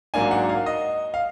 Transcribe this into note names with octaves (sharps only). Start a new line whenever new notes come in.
G#2 F#3 A#3 D4 G#5
F#5
F5
D#5
F5